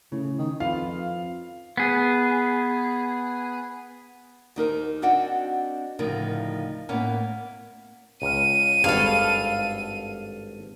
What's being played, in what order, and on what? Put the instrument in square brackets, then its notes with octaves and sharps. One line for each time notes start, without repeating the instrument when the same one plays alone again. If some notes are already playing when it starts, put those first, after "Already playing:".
[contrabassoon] A2 [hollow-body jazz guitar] C#3
[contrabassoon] D#3
[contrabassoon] F2 [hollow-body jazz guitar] F4 B4 [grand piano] F5
[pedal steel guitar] B3 G#4
[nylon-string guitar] D#2 D#4 A#4 C5
C4 D4 F#4 D#5 F#5 G5
D2 A2 C#3 F3 D#4 A#4
A2 A#3 B3 C#4 A#4
[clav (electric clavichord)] C#2 F5 [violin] D#7
[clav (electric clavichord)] G#1 G2 [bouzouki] A4 F5